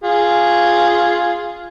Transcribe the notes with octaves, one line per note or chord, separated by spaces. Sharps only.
F4 G#4